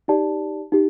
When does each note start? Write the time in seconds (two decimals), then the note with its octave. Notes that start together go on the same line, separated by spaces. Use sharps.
0.08 D#4 G4 D5 A5
0.72 D#4 G4